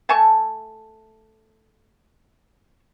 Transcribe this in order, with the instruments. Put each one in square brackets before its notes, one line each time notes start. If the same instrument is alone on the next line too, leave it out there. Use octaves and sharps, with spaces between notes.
[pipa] A3 G#5 A5 C#6